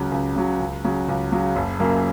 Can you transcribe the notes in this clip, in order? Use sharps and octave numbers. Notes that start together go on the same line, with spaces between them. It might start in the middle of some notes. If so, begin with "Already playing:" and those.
Already playing: C#2 C#3 F#3
C#2
C#3 F#3
C#2
C#3 F#3
C#2
C#3 F#3
F#1
F#2 C#3 A#3